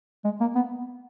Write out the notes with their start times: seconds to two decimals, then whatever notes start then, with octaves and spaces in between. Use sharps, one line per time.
0.24 G#3
0.41 A#3
0.56 B3